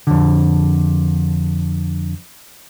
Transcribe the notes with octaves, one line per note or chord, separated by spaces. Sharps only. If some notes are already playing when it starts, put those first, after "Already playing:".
F2 D3